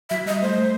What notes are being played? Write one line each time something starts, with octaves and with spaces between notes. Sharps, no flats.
F#3 E5
G3 D#5
A3 C5
A3